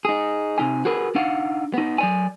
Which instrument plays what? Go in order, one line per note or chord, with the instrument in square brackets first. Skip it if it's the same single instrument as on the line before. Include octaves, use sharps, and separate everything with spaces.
[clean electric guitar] D#4 G#4
C3 D#4 G#5
F#4 G#4 A#4 B4
D4 D#4 F5 F#5
B3 D#4
F#3 D5 G#5